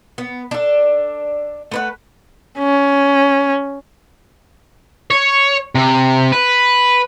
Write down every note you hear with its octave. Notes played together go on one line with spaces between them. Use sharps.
B3
D4 A4
A3 B4 F#5
C#4
C#5
C3
B4